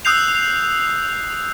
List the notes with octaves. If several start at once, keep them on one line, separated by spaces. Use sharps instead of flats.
D#6 E6 F#6 G6 C7 F7